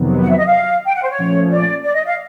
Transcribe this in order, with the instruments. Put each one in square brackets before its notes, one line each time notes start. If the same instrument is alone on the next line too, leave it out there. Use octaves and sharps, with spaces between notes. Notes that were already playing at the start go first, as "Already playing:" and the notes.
Already playing: [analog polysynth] F2 C3 D#3 F#3 B3
[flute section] F#5
E5
D#5
F5
G5
F#5
C5
C#5
[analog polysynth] A#2 F3 A3 C#4
[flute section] D5
D5
D#5
F5